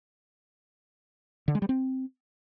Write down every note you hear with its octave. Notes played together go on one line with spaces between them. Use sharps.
D3
G#3
G3
C4